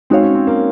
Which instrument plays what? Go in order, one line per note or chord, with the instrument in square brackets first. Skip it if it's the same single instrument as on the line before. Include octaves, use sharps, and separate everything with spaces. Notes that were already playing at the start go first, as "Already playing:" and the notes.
[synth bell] G#3 D#4 F#4 C#5 F5 [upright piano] C4
[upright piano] C#4
C4
A#3